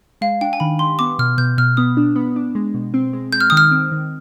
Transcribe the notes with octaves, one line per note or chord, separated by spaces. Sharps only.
G#3 F5
D4 G5
G#5
D#3 B5
G4 C6
B3 D6
B2 F6
B2 G6
B2 F6
B3 D#6
D4
B3
D4
G#3
B2
C4
G#3
G#3 G6
F6
D#3 D#6
F6
C4
D#3